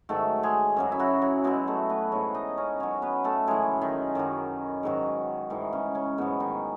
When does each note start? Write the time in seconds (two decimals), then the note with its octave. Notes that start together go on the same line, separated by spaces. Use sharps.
0.09 G#2 D#3 F#3 A3 A4
0.43 G#3 G#4
0.77 F#2 C#3 F#3
0.92 E4
0.99 F#3 F#4
1.22 F#3 F#4
1.44 B2 F#3 G#3 G#4
1.67 A3 A4
1.89 B3 B4
2.12 G#2 E3 C#4 C#5
2.34 D#4 D#5
2.57 C#4 C#5
2.80 B2 F#3 C#4 C#5
3.02 B3 B4
3.24 A3 A4
3.47 F#2 E3 G#3 G#4
3.81 D#3 D#4
4.15 F#2 D#3 F#3
4.83 G#2 D#3 F#3
5.50 G#2 D#3 E3 D#4
5.73 C#3 C#4
5.95 C#3 C#4
6.18 G#2 B2 F#3 B3
6.40 D#3 D#4